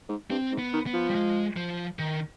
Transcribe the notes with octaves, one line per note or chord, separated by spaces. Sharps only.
G#2
G2 C4
G#2
B3
D#3
B3
F3
G3
G#3
F3
D#3